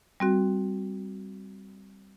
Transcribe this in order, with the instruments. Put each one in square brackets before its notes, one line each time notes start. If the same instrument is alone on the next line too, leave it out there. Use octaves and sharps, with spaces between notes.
[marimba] G3 C4 F#4